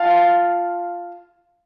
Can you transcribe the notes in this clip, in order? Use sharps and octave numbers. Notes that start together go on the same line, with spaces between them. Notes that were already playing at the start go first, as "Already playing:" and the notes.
Already playing: F4 F5 A5